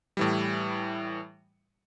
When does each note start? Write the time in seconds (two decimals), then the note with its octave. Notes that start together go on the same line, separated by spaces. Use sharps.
0.17 A2 E3 G3